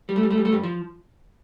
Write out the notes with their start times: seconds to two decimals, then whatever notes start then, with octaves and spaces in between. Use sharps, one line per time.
0.09 G3
0.16 A3
0.23 G3
0.30 A3
0.38 G3
0.45 A3
0.52 G2 G3
0.63 F3